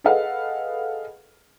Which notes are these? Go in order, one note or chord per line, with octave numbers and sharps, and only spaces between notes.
G#4 A4 B4 D#5 F5 F#5